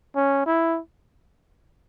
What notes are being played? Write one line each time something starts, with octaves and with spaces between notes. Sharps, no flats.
C#4
E4